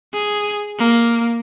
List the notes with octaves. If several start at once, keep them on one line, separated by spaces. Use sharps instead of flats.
G#4
A#3